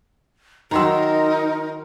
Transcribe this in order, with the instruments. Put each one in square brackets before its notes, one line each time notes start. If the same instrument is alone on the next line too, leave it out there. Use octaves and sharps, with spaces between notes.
[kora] D#3 F#3 [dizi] D#4 [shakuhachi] A#4 [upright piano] A#5 C6 E6